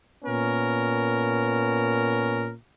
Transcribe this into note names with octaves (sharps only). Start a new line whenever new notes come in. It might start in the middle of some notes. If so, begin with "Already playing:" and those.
A#2 B3 C#4 A#4